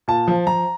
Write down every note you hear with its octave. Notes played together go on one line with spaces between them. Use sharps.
A#2 A5
F3
F3 A#5